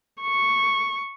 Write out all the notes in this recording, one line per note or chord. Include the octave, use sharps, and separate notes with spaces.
C#6